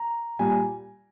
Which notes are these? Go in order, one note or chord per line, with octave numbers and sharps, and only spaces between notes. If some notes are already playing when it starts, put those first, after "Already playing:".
Already playing: A#5
A#2 G3 G#5